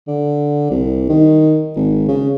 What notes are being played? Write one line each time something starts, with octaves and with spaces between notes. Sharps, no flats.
D3
C2
D#3
G#1
C#3